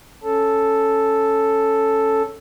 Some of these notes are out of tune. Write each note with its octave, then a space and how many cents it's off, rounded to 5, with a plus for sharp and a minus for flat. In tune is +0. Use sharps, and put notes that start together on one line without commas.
C#4 +0 A4 +0